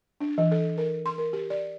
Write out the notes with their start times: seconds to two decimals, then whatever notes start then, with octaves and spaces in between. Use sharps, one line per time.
0.21 D4
0.38 E3
0.51 A4
0.78 A#4
1.06 C6
1.18 A#4
1.33 G4
1.50 D5